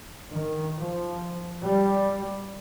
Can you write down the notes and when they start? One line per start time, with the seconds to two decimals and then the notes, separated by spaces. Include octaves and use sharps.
0.32 D#3
0.76 F3
1.64 G3